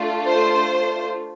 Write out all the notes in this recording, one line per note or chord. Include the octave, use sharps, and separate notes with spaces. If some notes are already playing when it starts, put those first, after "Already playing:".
Already playing: A3 D4 F4
C5